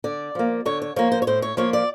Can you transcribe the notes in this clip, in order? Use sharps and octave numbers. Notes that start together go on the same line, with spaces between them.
D3 D5
F3 A#3
D3 C#5
C#5
F3 A#3 C#5
C5
C#5
A2 C5
C#5
F3 A#3 C#5
D5